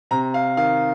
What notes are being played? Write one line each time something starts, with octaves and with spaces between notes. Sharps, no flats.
C3 A#5
F5
D#3 F5